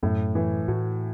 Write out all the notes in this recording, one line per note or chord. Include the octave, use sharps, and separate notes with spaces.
F#2 A2
E3
A2 F#4